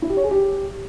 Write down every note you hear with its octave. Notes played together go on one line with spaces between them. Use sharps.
E4
G4
C#5
G#4
G4